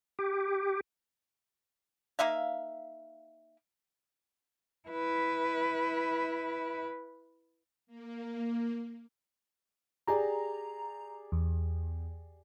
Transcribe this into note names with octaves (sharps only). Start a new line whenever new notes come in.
G4
A#3 D#4 E5 F5
E4 B4
A#3
G4 G#4 D5 A#5
E2